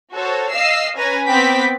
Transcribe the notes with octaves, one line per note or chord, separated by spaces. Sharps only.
F#4 A4 C5 C#5
D#5 F5 E6 C7
C#4 B4 G#5 A#5
B3 C4 G5 B5 D6 B6